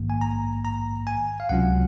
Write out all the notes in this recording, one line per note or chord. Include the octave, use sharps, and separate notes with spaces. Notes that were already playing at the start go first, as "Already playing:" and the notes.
Already playing: A#1 G#2 D#3 A#3
G#5
A#5
A#5
G#5
F5
C#2 C3 F#3 C#4 F4 F#5